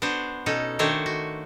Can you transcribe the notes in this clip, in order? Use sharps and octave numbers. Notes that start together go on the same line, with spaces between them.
B3 D4 F#4 C5
B2 C#4 D#4 A4
D#3 A3 D4 F#4 C5 C#5
F#4